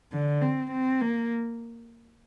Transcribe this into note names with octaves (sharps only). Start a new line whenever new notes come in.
D3
C4
C4
A#3